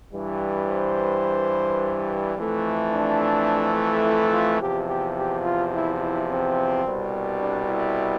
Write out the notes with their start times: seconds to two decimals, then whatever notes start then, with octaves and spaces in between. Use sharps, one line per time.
0.12 G2 E3 G3
0.68 C5
2.35 F2 E3 A3
2.92 D4
4.04 E4
4.32 F4
4.60 E2 C3 F3 G4
4.88 G4
5.16 G4
5.44 F4
5.73 E4
6.01 E4
6.29 C4
6.84 C2 B2 G3
7.40 D4
7.69 E4